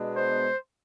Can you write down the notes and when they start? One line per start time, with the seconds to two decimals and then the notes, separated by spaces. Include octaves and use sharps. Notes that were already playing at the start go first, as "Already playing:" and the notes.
Already playing: B2 G#3 B3 D4
0.15 C5